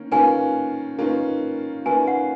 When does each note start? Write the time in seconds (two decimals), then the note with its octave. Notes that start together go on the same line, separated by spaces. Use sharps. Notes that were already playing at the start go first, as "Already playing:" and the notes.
Already playing: D#3 A#3 C#4
0.12 D#3 A#3 C#4 F4 B4 G#5
0.99 D#3 A#3 C#4 F4 B4
1.85 D#3 A#3 C#4 F4 B4 G#5
2.08 F#5